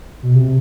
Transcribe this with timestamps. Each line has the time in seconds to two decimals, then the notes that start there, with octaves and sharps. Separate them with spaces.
0.23 B2
0.36 C3